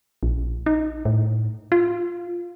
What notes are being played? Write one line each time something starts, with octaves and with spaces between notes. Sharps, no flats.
A#1
D#4
A2
F4